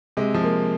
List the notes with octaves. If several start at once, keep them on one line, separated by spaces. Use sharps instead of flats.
C3 G#3
F3
A#3